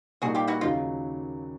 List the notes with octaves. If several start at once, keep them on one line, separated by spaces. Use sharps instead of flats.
A#2 G3 A#3 D#4 F#4 G#4
F4 G4
E4 F#4
D#2 C#3 F#3 D#4 F4